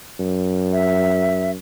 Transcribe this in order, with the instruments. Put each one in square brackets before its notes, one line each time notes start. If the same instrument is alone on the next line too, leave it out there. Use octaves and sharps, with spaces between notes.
[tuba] F#2
[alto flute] E5